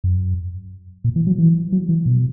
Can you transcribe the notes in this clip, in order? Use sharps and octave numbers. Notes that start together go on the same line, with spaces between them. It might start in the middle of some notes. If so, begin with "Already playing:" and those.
F#2
A#2
E3
F#3
E3
F#3
E3
B2